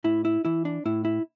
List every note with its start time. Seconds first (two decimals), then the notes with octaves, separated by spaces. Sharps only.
0.04 A2 E4
0.25 E4
0.45 E3 E4
0.65 D4
0.85 A2 E4
1.05 E4